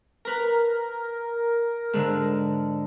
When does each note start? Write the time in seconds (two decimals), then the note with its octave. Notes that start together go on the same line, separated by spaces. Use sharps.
0.25 A#4 B4 A#5
1.93 G#2 D3